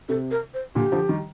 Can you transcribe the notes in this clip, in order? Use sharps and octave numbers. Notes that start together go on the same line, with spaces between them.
C3 A4
A#4
C5
A#2 D3 G4
D3 F3
D#3 G3